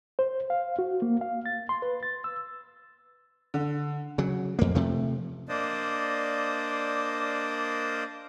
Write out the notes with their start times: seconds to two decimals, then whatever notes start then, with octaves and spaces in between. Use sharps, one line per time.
0.19 C5
0.50 F5
0.79 F#4
1.02 A#3
1.21 F5
1.46 A6
1.69 C6
1.82 B4
2.03 A6
2.24 E6
3.54 D3
4.18 C#3 F#3
4.59 F2 A#3
4.75 C3 F3 A3
5.49 A#3 D4 C5 D5 D#5